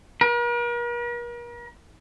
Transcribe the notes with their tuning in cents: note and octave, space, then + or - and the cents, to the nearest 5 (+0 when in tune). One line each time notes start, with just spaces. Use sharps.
A#4 +45